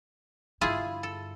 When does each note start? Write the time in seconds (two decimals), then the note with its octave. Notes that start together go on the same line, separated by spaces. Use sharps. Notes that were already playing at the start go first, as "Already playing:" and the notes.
0.61 G2 D3 E4 F4 G#4
1.03 A4